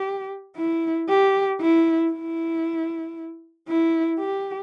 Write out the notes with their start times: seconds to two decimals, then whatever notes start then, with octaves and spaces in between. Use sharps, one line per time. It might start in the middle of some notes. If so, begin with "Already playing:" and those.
Already playing: G4
0.57 E4
1.09 G4
1.61 E4
2.12 E4
3.69 E4
4.19 G4